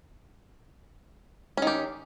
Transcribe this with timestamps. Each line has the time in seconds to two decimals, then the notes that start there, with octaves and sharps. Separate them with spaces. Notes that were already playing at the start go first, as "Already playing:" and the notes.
1.57 C#4
1.62 D#3
1.67 G4